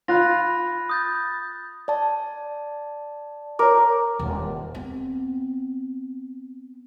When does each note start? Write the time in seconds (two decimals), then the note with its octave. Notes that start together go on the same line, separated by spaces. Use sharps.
0.08 F4 B5 F#6 A#6
0.89 D#6 G6 A6
1.88 D5 A5
3.59 A#4 C#5 D6
4.19 D#1
4.75 B3 C4